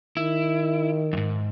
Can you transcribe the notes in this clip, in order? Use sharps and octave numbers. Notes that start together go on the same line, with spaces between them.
D#3 E4
F2 G#2